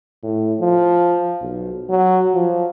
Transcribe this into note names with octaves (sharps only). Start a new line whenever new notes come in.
A2
F3
B1
F#3
F3